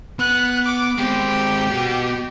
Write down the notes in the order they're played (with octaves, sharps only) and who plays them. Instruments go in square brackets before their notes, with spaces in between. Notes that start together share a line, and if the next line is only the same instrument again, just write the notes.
[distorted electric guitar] B3 [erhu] F#6
[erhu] D6
[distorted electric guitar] G#3 C4 [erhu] G4
[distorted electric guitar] B3 F#4